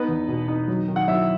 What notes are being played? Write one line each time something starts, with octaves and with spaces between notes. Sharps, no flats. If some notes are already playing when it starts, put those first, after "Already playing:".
Already playing: B3 D#4 B4
E2
B2
D#4
F#3
D#3
F#5
F#3 E4 E5